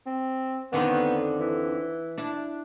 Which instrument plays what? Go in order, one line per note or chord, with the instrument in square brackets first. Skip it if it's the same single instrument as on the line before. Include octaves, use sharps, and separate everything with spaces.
[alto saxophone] C4
[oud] F2 D3 D#3 [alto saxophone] B3
[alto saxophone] E3
[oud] D4 E4